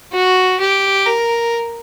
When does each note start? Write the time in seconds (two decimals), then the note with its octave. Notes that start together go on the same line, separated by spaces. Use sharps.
0.13 F#4
0.60 G4
1.06 A#4